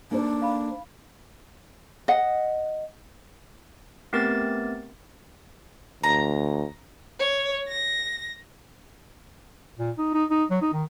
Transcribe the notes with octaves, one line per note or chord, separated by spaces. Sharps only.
A#3 D4 D#4 A4 C5
F5 A5 B5
D#5 F#5
A3 B3 C4 G4 A#4 A6
D2 A#5
C#5
A#6
A#2
D#4
D#4
D#4
F#3
D#4
D#3